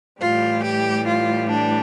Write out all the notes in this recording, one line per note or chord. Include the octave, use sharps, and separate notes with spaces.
A2 E3 G3 F4
G4
F4
D4